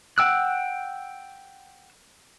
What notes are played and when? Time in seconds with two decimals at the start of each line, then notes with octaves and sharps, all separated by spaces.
0.18 F#5 G5 E6 F#6